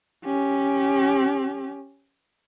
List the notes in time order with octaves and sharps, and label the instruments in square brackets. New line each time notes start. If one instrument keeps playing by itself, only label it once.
[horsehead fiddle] C#4 G4